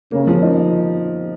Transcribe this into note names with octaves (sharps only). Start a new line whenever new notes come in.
C#3 A#3
F3
D#4